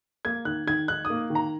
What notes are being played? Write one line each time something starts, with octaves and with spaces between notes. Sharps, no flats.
A#3 G#6
D#3 F#6
D#3 G#6
D#4 F#6
D#6
A#3
D#3
A#5